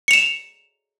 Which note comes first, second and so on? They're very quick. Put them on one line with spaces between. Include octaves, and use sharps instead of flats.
C#7 F7 E7